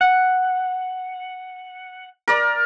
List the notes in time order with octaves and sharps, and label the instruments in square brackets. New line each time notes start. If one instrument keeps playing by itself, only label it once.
[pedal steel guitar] F#5
[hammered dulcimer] A#4 D5